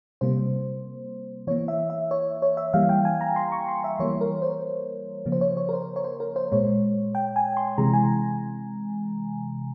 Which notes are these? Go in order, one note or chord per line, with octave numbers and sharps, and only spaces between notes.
C3 G3 A#3 C5
E3 A#3 C#5
E5
E5
C#5
C#5
E5
E3 G3 A#3 F5
G5
G#5
A#5
C6
C#6
C6
E5
E3 G3 A#3 C#5
A#4
C5
C#3 F3 A#3
C5
C#5
C#5
A#4
C5
C#5
C5
A#4
C5
A#2 G#3 C#5
G5
G#5
C6
C3 E3 G#3 A#5
G#5